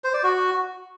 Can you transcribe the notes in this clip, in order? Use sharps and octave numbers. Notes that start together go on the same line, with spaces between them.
C5
D5
F#4